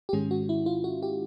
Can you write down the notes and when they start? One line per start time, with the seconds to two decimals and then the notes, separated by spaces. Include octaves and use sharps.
0.09 G4
0.13 G#2 D#3 G#3 C#4 G#4
0.31 F#4
0.49 E4
0.66 F4
0.84 F#4
1.02 G4